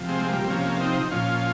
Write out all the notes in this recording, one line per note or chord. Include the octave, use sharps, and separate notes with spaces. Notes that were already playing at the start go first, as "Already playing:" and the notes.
Already playing: C3 F3
G#3 C4
G#3
G3 A#3
C4
C3 F3 A#3 C#4
C4 D#4
A#2 F3 C#4 F4